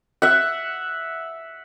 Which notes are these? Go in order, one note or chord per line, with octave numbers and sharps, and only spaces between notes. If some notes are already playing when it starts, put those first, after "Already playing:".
E5 F#5